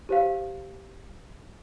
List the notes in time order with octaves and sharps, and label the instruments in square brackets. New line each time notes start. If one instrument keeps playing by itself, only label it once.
[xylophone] G4 C5 F5